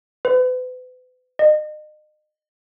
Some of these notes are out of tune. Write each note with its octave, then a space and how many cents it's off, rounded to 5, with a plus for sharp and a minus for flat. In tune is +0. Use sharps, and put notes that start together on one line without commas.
B4 +40
D#5 -35